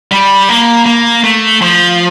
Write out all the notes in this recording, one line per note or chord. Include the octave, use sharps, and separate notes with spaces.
G3
A#3
A#3
A3
F3